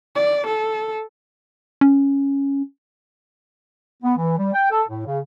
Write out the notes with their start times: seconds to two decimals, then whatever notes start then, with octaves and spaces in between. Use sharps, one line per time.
0.16 D5
0.47 A4
1.81 C#4
4.03 B3
4.17 E3
4.38 G3
4.53 G5
4.71 A4
4.88 A2
5.06 C#3